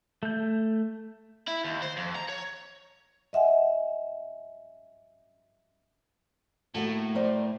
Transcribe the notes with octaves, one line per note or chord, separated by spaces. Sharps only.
A3 G6
E4
D#2
C5
F2
A#5
C#5
D#5 E5 F#5 G#5
A2 A#3 F#4 A4
A#4 C5 D5